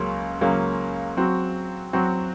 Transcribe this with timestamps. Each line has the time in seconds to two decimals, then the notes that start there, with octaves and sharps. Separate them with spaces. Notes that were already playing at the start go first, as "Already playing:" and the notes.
Already playing: C#2 C#3 F#3 A#3 C#4
0.41 C#2 C#3 F#3 A#3 C#4
1.17 F#3 C4 F#4
1.93 F#3 C4 F#4